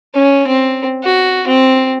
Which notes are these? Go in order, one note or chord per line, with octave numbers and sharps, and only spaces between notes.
C#4
C4
F#4
C4